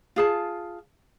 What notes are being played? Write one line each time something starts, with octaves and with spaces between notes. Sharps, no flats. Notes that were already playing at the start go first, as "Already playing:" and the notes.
F4 G#4 A5